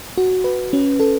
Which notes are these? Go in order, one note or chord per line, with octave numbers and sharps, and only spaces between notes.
F#4
B4
C#4
A4